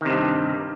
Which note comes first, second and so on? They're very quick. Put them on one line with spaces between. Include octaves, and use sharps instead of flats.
D#3 C3 G2